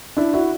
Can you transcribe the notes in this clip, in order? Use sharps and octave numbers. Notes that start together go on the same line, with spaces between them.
D4 E4
E4 F#4